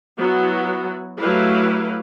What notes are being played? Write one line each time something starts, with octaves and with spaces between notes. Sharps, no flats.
F#3 B3 E4 F#4
F#3 A3 E4 G4 B4 F5